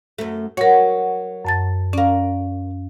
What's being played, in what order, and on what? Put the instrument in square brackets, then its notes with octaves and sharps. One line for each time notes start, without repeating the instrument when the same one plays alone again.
[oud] F#2 A3
[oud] F#3 F#4 [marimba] A#4 C#5
[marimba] F#2 A5 A6
[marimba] C#4 F5 [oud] A#4 D5